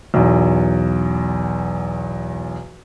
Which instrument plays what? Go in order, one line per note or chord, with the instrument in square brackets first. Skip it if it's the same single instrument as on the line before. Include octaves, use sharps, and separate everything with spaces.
[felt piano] B1 E2